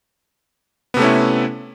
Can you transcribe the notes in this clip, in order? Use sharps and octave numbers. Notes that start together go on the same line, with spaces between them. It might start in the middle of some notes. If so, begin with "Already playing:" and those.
C3 A3 B3 C#4 E4